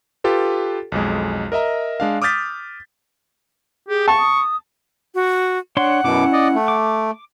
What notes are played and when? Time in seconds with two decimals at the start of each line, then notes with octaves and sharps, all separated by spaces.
0.24 F4 G4 A4 B4
0.92 B1 F2 G#3
1.52 A#4 D#5 E5 A#5
2.00 G#3 D4 F5
2.22 D6 D#6 F6 G6 A6 B6
3.89 G4 G#4
4.08 A5 C#6
4.19 D#6
5.15 F#4
5.77 D4 C#5 F#5 C6
6.04 F#2 B2 C#4 E4 D6
6.33 D5 D#5
6.55 A3
6.68 D6